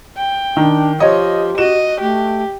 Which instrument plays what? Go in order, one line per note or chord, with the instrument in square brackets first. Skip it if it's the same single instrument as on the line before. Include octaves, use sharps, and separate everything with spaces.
[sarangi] G5
[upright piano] D#3 [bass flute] D4
[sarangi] F3 [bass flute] G4 [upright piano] C#5 D#5
[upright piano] F#4 E7 [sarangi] D#5
[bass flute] A3 [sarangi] G4